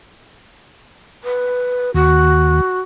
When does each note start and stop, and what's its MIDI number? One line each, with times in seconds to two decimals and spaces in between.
1.24 1.91 71
1.94 2.61 39
1.94 2.80 66